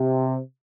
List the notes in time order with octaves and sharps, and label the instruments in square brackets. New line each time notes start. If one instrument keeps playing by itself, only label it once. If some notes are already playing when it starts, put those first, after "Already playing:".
Already playing: [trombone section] C3